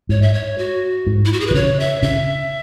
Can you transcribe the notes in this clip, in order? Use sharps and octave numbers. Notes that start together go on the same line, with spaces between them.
G#2 C#5
E5
C#5
F#4
G#2
E4
F#4
G#4
B4
E3
C#3 C#5
E5
C#3 E5